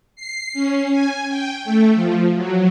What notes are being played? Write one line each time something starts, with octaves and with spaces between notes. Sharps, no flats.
C7
C#4
G#5
G5
A3
F3
F#3